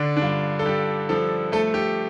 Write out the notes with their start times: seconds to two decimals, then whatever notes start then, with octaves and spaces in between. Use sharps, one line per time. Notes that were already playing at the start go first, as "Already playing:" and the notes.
Already playing: D3 D4
0.16 D4
0.22 G2 F4
0.59 A4
0.66 G2 G4
1.09 F3 A4
1.52 A3 A4
1.74 G4